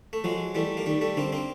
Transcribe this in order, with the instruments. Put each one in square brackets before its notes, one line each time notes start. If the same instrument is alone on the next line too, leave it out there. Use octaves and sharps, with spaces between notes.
[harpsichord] A3
[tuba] F3 [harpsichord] F#3 G#3
[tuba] E3 [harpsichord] G3 A3
[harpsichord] A#3
[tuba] D#3 [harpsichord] G3 A3
[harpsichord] G3 A3
[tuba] D3 [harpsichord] A#3 C4
[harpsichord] A#3 C4